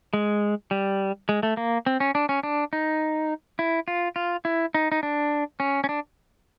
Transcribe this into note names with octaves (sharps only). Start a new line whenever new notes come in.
G#3
G3
G#3
A3
A#3
C4
C#4
D4
C#4
D4
D#4
E4
F4
F4
E4
D#4
D#4
D4
C#4
C#4
D4